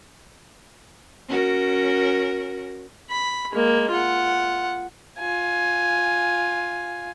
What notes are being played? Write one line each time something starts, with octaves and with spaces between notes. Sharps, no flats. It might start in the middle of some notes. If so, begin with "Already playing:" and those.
C#4 F#4 A#4
B5
G#3 A#3
F4 F#5
F4 G#5